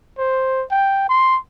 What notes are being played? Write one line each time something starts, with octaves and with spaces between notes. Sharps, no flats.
C5
G5
C6